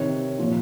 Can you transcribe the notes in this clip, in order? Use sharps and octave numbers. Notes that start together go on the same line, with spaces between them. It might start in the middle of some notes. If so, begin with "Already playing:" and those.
Already playing: C3 D#3 C#5
A#2 F3